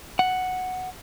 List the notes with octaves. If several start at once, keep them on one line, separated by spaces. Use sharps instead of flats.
F#5